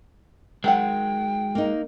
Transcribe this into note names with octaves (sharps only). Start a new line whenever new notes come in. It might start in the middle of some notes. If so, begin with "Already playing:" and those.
D#3 F#3 G#3 F#5 G5
A#3 D#4